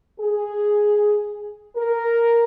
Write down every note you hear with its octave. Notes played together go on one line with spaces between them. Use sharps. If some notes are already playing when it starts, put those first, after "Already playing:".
G#4
A#4